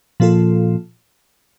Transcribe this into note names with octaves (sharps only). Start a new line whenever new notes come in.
A#2 F3 A#3 F4 A4